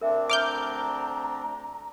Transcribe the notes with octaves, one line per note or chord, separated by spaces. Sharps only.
D2 C4 D4 A#4 E5 G5
A#5 D6 F6 G6